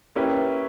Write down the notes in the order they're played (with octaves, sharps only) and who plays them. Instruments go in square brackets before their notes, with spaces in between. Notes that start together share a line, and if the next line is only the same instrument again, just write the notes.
[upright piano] A#3 C#4 E4 G4 B4